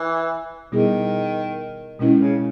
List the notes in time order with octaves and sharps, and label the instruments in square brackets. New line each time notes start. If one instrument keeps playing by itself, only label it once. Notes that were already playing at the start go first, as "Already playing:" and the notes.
Already playing: [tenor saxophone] E3
[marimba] B2 G3 B3 E4 G#4 [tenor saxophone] D#3
[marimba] B2 G#3 C#4 E4 [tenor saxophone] D#3
[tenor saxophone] C#3